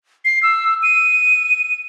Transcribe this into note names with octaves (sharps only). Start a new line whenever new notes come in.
C7
E6
D#7